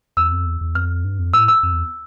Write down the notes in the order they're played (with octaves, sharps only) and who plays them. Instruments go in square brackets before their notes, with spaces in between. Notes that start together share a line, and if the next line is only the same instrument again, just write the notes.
[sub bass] E2 [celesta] E6
[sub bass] F2
E2
E2
[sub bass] F2 [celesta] F6
[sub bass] G2
F2
[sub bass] A2 [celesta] E6
[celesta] E6
[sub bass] F2
E2